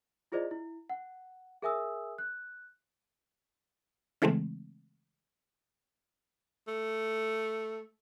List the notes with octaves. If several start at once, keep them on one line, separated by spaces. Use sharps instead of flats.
E4 F4 G#4 C5 D5 D#5
E4
F#5
G#4 A#4 E5 G#5 D#6 E6
F#6
C#3 E3 G#3 A3 C4
A3